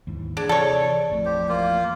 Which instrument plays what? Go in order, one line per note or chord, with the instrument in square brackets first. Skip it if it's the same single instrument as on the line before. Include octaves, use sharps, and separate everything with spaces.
[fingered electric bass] D#2 G#2 E3
[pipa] D4 [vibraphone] G#4
[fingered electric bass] C3 E3 [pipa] A4 C#5 [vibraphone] D5
[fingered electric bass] A1 F2 A2
[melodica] G4 C5
A#3 F4